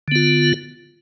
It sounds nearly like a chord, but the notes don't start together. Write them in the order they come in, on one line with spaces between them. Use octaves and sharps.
D3 B3 F4